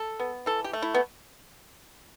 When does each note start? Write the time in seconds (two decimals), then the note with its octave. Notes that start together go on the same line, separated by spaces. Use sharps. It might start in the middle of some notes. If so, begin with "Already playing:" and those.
Already playing: A4
0.20 B3
0.46 E3 A4
0.64 G4
0.73 A3
0.82 E4
0.95 B3